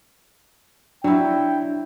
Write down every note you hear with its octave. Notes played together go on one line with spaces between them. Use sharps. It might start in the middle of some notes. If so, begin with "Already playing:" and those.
F#3 D4 E4 G5